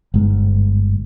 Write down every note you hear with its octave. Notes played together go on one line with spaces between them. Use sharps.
G1 G#2